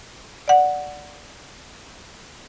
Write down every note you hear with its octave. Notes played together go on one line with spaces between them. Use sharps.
D5 F#5